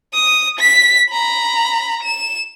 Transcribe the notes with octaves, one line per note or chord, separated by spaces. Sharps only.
D#6
B6
A#5 B5
E7